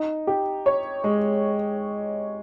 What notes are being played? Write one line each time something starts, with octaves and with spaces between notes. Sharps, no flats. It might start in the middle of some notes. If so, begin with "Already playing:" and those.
Already playing: D#4
G4
C#5
G#3